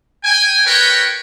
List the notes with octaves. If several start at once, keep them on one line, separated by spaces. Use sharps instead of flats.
G5 G#5
F#4 A#4 B4 C#5 G5